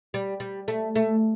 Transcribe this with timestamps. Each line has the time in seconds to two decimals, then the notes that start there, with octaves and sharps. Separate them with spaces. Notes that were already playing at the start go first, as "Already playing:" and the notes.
0.14 G3
0.40 G3
0.68 A3
0.96 A3